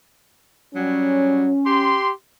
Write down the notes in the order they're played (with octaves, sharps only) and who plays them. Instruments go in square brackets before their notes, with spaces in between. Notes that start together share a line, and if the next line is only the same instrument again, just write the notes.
[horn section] F#3 G3 [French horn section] C#4
[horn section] G4 C6